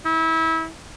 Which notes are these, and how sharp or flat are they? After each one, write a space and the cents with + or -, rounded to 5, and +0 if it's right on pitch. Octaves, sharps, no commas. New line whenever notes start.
E4 -25